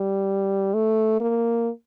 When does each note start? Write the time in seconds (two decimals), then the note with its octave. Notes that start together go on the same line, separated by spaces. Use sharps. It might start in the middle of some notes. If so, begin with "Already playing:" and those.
Already playing: G3
0.74 A3
1.20 A#3